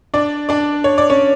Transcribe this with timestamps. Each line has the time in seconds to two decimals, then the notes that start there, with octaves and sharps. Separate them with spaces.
0.14 D4 D5
0.49 D4 D5
0.84 C#5
0.98 D5
1.10 C#4 C#5